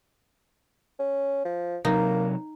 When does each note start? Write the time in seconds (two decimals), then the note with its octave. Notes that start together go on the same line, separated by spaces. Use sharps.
0.99 C#4
1.45 F3
1.85 C3 F#3 A#3 D#4